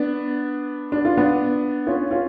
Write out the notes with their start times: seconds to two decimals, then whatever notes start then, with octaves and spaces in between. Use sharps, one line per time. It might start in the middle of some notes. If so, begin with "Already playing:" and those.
Already playing: B3 D4
0.92 D4
1.05 F4
1.17 B3 D4
1.87 C#4 F4
2.11 C#4 F4